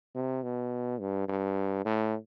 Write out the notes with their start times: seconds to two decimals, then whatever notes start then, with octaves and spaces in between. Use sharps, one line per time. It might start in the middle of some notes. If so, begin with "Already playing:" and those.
0.15 C3
0.43 B2
1.00 G2
1.29 G2
1.85 A2